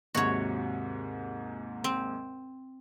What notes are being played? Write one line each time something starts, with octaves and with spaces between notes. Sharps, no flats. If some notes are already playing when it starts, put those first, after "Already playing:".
D#2 G#2 C3 F#4 C#5
C4